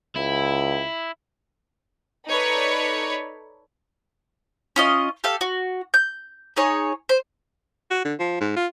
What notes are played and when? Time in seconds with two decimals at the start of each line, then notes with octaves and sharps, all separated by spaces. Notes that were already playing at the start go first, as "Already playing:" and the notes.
0.16 C#2 E4
2.27 D#4 A4 B4 C#5 D5 B5
4.76 C#4 F4 D#5
5.24 G4 A4 F5
5.41 F#4
5.94 G6
6.56 D#4 G#4 C#5
7.09 C5
7.90 F#4
8.05 D3
8.19 F3
8.41 G#2
8.56 F4